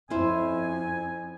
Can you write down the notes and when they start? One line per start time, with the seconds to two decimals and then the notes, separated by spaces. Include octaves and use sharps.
0.10 F2 C#4 E4 C5 G#5